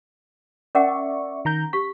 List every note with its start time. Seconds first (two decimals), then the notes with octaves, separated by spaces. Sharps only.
0.75 C#4 A#4 D5 E5 F#5 C#6
1.45 D#3 A#5 G6
1.73 G4 C#6 B6